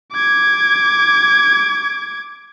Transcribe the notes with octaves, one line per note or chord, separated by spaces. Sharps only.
D6 G#6